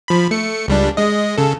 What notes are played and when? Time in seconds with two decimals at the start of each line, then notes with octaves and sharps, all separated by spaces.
0.08 F3 B5
0.31 A3 C#7
0.68 C#2 G3 D4
0.97 G#3 D#5
1.38 C#3 A4